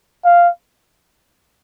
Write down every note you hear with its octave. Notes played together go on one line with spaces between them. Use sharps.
F5